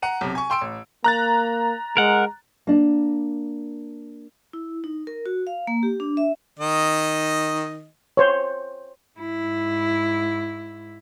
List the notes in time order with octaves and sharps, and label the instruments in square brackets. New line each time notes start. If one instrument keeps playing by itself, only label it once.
[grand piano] F#5 A#5 D#7
B1 C3
G#5 C#6
G5 C6 E6 D7
A1
[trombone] A#3 [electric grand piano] A#5 F#6 A6
[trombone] G#3 [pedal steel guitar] A#4 F#5
[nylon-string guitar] A#3 D4
[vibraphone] E4
D#4
A#4
F#4
F5
A#3
G4
D4
E5
[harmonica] D#3 D#5
[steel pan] C5 C#5
[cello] G#2 E4